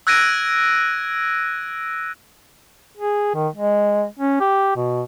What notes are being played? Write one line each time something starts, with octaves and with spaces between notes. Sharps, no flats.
E6 F#6 G#6 A#6 D7 D#7
G#4
D#3
G#3
C#4
G4
B2